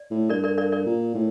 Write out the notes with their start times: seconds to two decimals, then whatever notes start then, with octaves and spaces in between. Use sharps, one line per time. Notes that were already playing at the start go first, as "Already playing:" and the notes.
Already playing: D5
0.11 A2
0.29 G2 A#4 D5
0.44 A#4 D5
0.58 A#4 D5
0.72 A#4 D5
0.86 A#2
1.14 A2